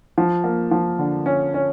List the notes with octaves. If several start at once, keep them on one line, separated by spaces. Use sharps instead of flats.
F3
A#3
F3
D3
C#4
C#4